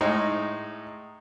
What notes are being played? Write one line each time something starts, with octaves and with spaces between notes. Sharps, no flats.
A2 G#3 D#4